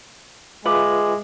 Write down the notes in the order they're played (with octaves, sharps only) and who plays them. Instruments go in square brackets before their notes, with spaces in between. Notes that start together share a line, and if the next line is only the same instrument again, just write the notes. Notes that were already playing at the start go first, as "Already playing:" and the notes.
[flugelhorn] G#3 [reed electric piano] F4 B4 E5 [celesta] D6 F#7